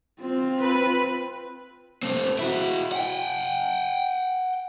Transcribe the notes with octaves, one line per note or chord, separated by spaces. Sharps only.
C4 F4
B4
A3 C4
E4 F#4
F#5 G5